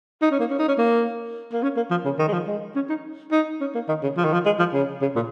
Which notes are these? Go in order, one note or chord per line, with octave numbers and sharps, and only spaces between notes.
D#4
C#4
A#3
C#4
D#4
C#4
A#3
A#3
C#4
A#3
F3
C#3
D#3
G#3
F3
G#3
C#4
D#4
D#4
C#4
A#3
D#3
C#3
F3
D#3
F3
G#3
F3
C#3
C#3
A#2